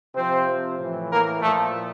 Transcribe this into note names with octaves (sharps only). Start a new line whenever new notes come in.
C3 F3 C4 C5
A2 E3
A#3 A#4
A#2 F3 A3 A4